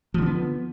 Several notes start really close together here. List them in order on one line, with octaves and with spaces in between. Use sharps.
F3 D3 D4 B3